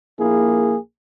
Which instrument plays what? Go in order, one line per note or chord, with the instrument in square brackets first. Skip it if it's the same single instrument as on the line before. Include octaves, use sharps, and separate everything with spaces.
[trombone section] A#1 A#3 E4 G#4